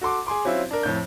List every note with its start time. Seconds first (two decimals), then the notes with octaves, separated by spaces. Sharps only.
0.01 F#4 A4 C6 D6
0.27 G#4 G#5 C6 D6
0.45 F#3 C4 C#4 E4 F4
0.71 D4 A#4
0.83 F2 A2 G6